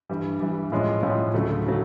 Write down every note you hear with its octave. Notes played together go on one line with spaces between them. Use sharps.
G2 E3 G3
G2 E3 G3
A2 F3 G#3 C#4 F4
A2 F3 G#3 C#4 F4
D2 C#3 F#3 A3
C#3 F#3 A3